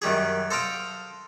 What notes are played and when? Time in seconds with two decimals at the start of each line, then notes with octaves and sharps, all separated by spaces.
0.02 F#2 D#3 G3 G#4
0.51 A4 C5 D#5 F5 G5